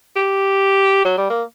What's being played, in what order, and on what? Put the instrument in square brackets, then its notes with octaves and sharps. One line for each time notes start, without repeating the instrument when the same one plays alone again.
[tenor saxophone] G4
F#3
G3
A#3